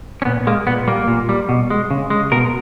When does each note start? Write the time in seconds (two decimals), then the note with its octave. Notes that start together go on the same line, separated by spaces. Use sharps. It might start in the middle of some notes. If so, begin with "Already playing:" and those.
0.22 C#4
0.25 A#2 B3
0.47 G#3 A#3
0.67 A#2 B3
0.88 G3 A#3
1.08 A#2
1.29 G3
1.49 B2
1.70 G#3
1.91 C#3
2.10 G#3
2.32 B2 A#4